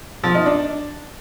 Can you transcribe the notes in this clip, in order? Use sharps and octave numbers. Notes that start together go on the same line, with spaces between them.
F3
D#4
D4